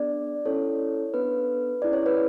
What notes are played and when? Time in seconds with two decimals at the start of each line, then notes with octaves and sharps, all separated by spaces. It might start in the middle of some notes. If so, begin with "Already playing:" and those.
Already playing: B3 D4 G#4 D5
0.45 C#4 E4 A4 C#5
1.14 B3 D4 A4 B4
1.82 C#4 E4 G#4 D5
1.93 C#5
2.06 B4